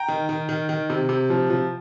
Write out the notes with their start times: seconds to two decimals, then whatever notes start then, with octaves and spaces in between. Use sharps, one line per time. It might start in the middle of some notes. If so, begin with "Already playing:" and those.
Already playing: G5 A#5
0.08 D#3
0.29 D#3
0.49 D#3
0.69 D#3
0.90 C3
1.09 C3
1.30 F3
1.50 F3